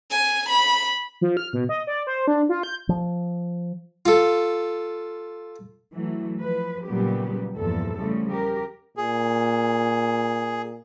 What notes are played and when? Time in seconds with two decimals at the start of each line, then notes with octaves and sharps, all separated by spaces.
0.11 G#5
0.49 B5
1.21 F3
1.37 F6
1.53 B2
1.69 D#5
1.87 D5
2.07 C5
2.27 D4
2.49 F4
2.63 G6
2.89 F3
4.06 F4 A4
5.93 E3 F#3 A3
6.40 F3 B4
6.85 A#2 C#3 F#3 G3 B3 G4
7.55 E2 G2 A#2 F3 A4
7.98 C#3 F3 G3 A3
8.30 G4 A#4
8.97 A#2 G#4